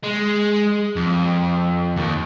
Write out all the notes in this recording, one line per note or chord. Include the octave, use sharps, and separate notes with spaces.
G#3
F2
D#2